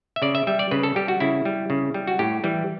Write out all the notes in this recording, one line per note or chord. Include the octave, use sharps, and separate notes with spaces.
E5
C#3 D5
E5
G3 E5
D5
C#3 B4
A4
G3 G4
F#4
C#3 E4
G3
C#3
G3
F#4
A2 G4
E3 G3